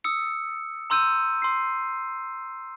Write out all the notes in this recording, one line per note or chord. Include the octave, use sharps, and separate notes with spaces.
D#6 E6 C#7
A#5 C6 E6 G6 D#7
C6 C7